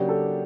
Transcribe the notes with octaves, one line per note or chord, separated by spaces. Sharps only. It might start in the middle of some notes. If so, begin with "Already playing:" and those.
Already playing: C#3 F#3 A#3 D4 G4
A4